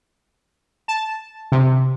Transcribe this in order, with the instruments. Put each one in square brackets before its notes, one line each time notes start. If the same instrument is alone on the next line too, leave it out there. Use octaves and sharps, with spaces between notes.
[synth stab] A5
C3